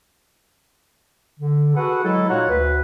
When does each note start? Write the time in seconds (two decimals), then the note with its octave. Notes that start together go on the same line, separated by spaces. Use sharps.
1.40 D3
1.75 F#4 G#4 A4 B4 F#5
2.03 F#3 G#3 E4 A4
2.29 A#2 D#4 F4 F#4 C#5 F#5
2.49 D2 B4